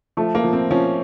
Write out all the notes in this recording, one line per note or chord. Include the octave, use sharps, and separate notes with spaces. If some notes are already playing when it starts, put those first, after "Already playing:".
F3 A3
A#3
F3
C4
F3 C#4